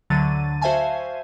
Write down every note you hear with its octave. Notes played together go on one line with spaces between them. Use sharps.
D2 D3 F#3 A6 D#7
F#4 C5 E5 F5 G#5 A5